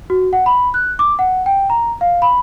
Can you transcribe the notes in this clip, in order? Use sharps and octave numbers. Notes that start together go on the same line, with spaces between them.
F#4
F#5
B5
F#6
D6
F#5
G5
A#5
F5
B5